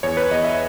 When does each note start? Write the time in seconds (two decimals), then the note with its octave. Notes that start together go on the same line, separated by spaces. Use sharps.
0.03 E2 C#5
0.17 B4
0.31 E2 D#5
0.44 E5